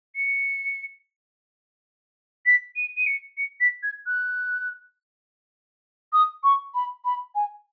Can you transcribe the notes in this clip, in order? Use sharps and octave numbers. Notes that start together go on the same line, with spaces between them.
C#7
B6
D#7
D#7
C#7
C#7
B6
G#6
F#6
D#6
C#6
B5
B5
G#5